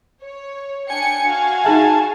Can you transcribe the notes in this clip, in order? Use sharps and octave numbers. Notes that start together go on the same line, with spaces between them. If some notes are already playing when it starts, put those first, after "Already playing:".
C#5
D4 G5 G#5 C#7
F#4 F5
D#4 G#4 E5 A5